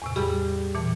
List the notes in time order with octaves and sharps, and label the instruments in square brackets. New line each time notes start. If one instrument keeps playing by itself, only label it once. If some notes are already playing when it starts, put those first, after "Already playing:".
[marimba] E2 A2 C3
[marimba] C3 G#4 [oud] G3
[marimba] A#2 E3 A5